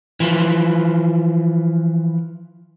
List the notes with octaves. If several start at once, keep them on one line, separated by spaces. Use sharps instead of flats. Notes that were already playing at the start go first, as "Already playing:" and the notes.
E3 F3